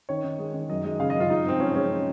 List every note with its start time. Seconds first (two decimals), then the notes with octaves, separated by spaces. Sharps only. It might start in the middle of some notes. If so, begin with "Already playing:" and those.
0.09 D#3 C#5
0.24 D#3
0.39 G#3
0.54 D#3
0.69 F#2 D#5
0.85 G#3 D#5
1.00 C#3 F5
1.10 D#5
1.15 F#2 F4
1.30 G#3 D#4
1.46 G#2 C4
1.60 F3 C#4
1.75 G#3 C#4